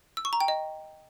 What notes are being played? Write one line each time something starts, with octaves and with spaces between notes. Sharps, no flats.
E6
C#6
A#5
G5
D#5